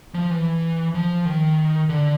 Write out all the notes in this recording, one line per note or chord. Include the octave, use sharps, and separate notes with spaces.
F3
E3
F3
D#3
D3